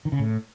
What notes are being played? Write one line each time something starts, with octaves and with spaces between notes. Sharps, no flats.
D#3
C#3
A2